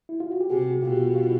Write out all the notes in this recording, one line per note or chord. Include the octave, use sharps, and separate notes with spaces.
E4
F4
F#4
G4
C3 F#4 G#4
B2 F4 G4
F4
E4